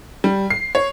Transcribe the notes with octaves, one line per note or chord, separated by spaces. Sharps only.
G3
C7
C#5